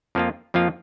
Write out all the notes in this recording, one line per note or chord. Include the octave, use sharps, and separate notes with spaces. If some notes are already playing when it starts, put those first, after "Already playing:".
F2 F3 A#3 F4
F2 F3 A#3 F4